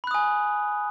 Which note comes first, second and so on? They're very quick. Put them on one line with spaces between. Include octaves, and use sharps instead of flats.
B5 F#6 D#6 G#5